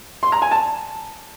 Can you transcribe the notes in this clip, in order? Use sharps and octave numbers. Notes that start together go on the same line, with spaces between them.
C6
A#5
G#5
A5